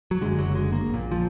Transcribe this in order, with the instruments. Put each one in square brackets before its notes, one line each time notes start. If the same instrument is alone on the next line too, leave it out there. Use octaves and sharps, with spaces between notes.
[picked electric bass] F#3
F#1 F#2 D3 G#3
F#3
G#3
A#3
A#1 A#2
F3